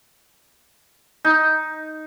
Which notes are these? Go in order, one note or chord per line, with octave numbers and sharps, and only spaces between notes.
D#4